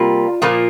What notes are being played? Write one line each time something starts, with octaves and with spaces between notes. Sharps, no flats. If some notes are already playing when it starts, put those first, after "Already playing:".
Already playing: C3 G3 A#3 F4
A#2 F3 A#3